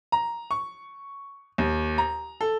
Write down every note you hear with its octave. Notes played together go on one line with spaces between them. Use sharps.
A#5
C#6
D#2
A#5
A4